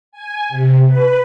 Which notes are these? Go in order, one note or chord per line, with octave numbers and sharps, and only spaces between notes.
G#5
C3
B4